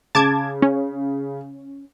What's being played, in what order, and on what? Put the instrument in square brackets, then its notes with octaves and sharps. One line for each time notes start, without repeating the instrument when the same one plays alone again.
[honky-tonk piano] C#3 [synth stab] A5 D6 G#6
[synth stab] C#4